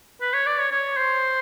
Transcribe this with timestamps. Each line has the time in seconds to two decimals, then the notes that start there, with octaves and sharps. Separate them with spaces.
0.21 B4
0.34 C#5
0.46 D5
0.59 C#5
0.72 C#5
0.97 C5